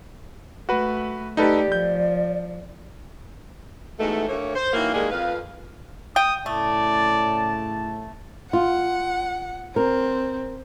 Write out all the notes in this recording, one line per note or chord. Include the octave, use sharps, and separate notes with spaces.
A3 F#4 B4
A3 D#4 G4 A4 B4 D5
F3 G6
E2 G#2 B2 A3
D2 A3 A#3 C#5
C5
D#3 E3 F#3 A#3
A2 D#3 G3 G#3 A#3 G#4
F2 B4 F5
G5 D#6
A2 C#3 A3 D5 A5
F4 F#5
C4 A#4